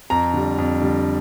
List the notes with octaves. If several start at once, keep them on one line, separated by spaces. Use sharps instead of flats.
F2 A#5
D3 G3
F2
D3 G3